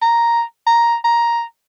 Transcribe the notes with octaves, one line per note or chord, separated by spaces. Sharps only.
A#5
A#5
A#5